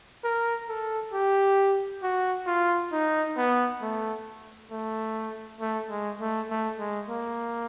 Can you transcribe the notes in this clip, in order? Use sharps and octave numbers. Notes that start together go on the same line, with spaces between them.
A#4
A4
G4
F#4
F4
D#4
B3
A3
A3
A3
G#3
A3
A3
G#3
A#3